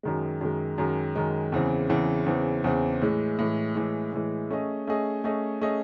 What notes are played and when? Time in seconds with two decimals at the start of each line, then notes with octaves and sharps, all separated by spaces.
0.03 F#2 D#3 G#3
0.41 F#2 D#3 G#3
0.78 F#2 D#3 G#3
1.15 F#2 D#3 G#3
1.52 E2 C#3 E3 C4
1.89 E2 C#3 E3 C4
2.26 E2 C#3 E3 C4
2.64 E2 C#3 E3 C4
3.02 A2 E3 G#3
3.39 A2 E3 G#3
3.75 A2 E3 G#3
4.13 A2 E3 G#3
4.50 A3 C#4 G#4 D#5
4.87 A3 C#4 G#4 D#5
5.24 A3 C#4 G#4 D#5
5.61 A3 C#4 G#4 D#5